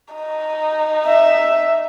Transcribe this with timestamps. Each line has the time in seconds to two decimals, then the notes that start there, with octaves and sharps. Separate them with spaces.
0.14 D#4
1.06 E5